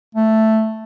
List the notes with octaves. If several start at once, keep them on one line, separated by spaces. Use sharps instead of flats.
A3